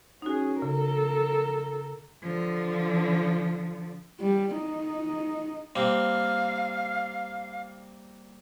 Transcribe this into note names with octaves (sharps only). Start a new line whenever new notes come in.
C#4 D#4 F#4 G#4
C#3 A4 A#4
D3 F3
G3
D#4
G3 A#3 C4 F5